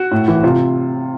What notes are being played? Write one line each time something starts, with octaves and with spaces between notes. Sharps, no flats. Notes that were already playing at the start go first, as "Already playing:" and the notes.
Already playing: F#4
A2
E3
C3 F4